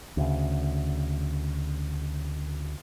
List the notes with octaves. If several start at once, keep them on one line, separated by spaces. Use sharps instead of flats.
D2 C#3